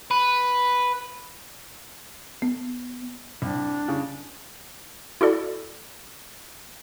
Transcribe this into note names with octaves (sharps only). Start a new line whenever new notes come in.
B4
B3
C2 D4
C#3
E4 F#4 A4 D5